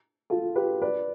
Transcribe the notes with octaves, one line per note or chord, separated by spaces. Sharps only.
F4 A4
G4 B4
B4 D5